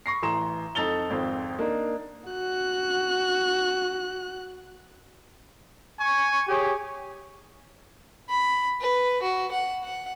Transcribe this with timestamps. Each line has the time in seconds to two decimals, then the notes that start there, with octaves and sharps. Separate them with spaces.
0.06 B5 C#6 A#6 C7
0.22 A1 E3 A#5 C6 E7
0.75 F2 D#4 A4 A6 F7 G7
1.10 G#1 F2 C4
1.59 A#3 D4 D#4
2.30 F#4 F#6
6.00 G#5 C#6
6.48 G4 G#4 C#5
8.29 B5
8.81 B4
9.22 F#4
9.51 F#5
9.84 F#5